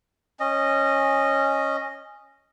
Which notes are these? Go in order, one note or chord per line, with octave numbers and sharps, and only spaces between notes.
C#4 D#5